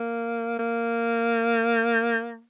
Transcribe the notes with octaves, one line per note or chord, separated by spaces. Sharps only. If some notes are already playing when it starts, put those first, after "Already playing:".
Already playing: A#3
A#3